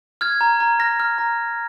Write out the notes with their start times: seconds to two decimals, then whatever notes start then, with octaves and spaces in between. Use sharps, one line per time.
0.21 F6 G#6
0.41 A#5
0.60 A#5
0.80 F6 A#6
1.00 F6
1.18 A#5